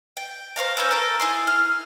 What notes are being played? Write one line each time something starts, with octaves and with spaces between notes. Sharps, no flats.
G5
C5 C#5 F5 A#5
C#4 B4 E6 G6
A4 A#4
E4 G#4 C6
F6